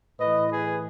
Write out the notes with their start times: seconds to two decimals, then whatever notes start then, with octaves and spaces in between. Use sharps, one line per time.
0.20 A2 E3 B4 D#5
0.50 G#4 B4